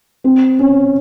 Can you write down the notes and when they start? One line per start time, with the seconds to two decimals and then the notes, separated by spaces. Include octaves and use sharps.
0.24 C4
0.59 C#4